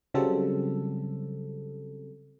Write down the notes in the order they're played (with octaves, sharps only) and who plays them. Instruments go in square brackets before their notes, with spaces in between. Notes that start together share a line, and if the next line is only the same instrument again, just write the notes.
[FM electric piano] C#3 F#3 G3 C4 A4